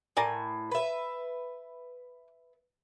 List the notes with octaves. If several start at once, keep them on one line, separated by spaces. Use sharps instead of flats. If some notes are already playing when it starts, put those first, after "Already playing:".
A2 A#4 D5 G#5
B4 E5